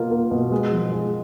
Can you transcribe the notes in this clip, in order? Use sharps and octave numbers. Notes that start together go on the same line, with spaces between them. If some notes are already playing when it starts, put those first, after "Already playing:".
Already playing: B2 A#3 F4
A#3
B2
G#3
F3
G#3